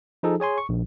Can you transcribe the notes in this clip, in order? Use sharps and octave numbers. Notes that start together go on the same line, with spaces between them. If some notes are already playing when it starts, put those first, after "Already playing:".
F3 D#4 G#4 A4
G#4 C#5 G#5 C6
C#6
A#1